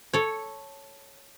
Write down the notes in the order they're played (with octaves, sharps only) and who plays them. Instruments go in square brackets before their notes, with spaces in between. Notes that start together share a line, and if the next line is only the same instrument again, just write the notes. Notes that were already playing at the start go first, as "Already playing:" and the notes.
[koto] A4 C#5